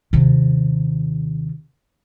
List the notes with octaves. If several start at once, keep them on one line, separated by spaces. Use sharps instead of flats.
D#2 C3